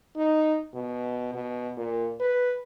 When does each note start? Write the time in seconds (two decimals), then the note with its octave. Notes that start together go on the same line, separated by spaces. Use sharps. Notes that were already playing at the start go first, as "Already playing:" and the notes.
0.17 D#4
0.75 B2
1.34 B2
1.77 A#2
2.20 B4